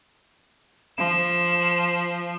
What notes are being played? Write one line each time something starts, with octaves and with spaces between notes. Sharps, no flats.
F3 E7